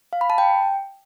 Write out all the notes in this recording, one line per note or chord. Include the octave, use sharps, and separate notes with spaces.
F5
B5
A5
G5